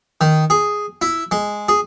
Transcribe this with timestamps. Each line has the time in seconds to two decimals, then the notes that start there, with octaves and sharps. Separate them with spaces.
0.21 D#3
0.50 G#4
1.02 E4
1.31 G#3
1.69 G#4